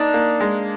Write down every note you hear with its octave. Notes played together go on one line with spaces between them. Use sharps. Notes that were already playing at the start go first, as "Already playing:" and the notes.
Already playing: A#3 D4 D#4
A#3
G#3